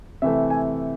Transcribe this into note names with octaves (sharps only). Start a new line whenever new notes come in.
C3 E3 A3 E5
G#5